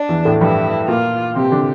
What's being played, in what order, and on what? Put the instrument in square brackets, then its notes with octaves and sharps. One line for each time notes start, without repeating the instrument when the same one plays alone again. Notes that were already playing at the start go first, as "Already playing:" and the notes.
Already playing: [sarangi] D4
[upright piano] E2 E3
A2 A3
[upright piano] G2 G3 [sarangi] E4
[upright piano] A#2 A#3 [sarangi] F4
[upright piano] C3 C4 [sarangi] G4
[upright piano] D3 D4